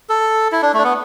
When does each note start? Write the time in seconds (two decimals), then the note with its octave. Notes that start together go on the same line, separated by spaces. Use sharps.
0.09 A4
0.52 E4
0.62 D4
0.74 A3 D4
0.84 B3